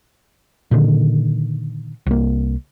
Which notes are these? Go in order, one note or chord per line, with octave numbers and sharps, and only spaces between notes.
A#2 D3 D#3
C2 A#3